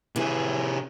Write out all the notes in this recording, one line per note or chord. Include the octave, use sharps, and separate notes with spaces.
C3 E3 G#4 B4